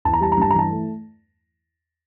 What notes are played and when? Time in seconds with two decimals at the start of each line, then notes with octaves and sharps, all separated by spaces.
0.05 E2 A5
0.13 A#5
0.21 G3 A5
0.32 A#5
0.37 G2 A5
0.51 E3 A#5
0.59 A5
0.70 A3